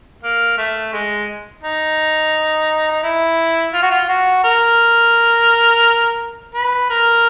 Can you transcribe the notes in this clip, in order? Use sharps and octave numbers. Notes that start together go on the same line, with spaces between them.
A#3
A3
G#3
D#4
D#4
E4
F4
F#4
F4
F#4
A#4
B4
A#4